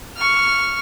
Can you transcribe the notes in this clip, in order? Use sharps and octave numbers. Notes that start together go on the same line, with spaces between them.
C#6 F6